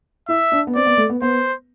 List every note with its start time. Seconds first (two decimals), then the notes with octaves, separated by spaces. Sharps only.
0.28 E4 E5
0.52 D4
0.67 B3
0.75 C4 D5
0.86 B3
0.97 A3
1.10 B3
1.22 B3 C5